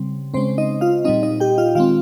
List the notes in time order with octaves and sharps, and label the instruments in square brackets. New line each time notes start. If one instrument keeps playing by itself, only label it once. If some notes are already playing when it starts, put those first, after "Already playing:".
Already playing: [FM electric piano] C#3 G3 C4
C#3 G#3 C4 C#4 C5
D#4 D#5
F4 F5
A#2 G3 C4 D#4 D#5
D#4 D#5
G4 G5
F4 F5
D#3 G#3 C4 F4 F5